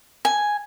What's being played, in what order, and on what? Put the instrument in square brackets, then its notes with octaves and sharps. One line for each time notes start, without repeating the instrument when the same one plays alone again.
[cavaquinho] G#5